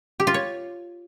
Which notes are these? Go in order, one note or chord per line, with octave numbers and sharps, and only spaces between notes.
G4
F4
C#5